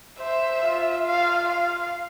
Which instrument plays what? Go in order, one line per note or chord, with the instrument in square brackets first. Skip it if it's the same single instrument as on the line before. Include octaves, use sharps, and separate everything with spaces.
[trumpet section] C5 [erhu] E5
[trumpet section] F4
[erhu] F5
F5